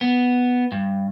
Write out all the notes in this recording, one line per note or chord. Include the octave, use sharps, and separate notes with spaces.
B3
G2